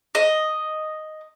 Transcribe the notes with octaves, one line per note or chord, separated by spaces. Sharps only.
D#5